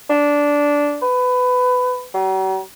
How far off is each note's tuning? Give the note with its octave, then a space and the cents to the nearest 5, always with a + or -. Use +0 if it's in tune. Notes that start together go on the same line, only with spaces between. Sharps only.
D4 -10
B4 +20
F#3 +45